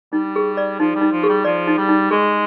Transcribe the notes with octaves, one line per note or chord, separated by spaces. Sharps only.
G3 D#4
G#4
D5
F3 D#4
G3
D#4
F3
G#4
G3
F3 D5
D#4
G3
D#4
G#3 G#4